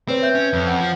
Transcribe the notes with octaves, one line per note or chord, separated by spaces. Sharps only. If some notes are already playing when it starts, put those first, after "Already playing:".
C4 B4 C#5
B4 E5 G6
C#4
F2
F#5
F3